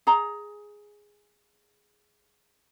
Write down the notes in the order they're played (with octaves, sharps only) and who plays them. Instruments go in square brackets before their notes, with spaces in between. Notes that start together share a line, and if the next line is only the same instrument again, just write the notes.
[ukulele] G#4 A#5